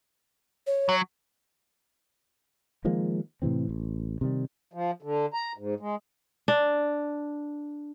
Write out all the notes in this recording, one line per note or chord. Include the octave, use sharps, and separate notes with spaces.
C#5
F#3
D#3 F3 G#3 A#3
A2 C3 E3 C4
A1
C3 D#3 G3
F3
D3
A#5
G#2
G#3
D4